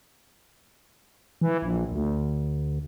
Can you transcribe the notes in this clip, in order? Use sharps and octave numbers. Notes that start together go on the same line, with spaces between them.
E3
A#1
D2